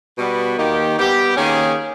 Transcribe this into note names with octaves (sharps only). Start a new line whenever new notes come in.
B2 G3 B3
D#3 A#3 D#4 G4
G3 B3 G4
D#3 A#3 C#4 G#4